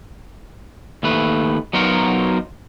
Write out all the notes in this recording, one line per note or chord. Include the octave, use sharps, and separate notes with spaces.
D#2 A3 B4
F#3 B3 D#4 F4 F#4 A#4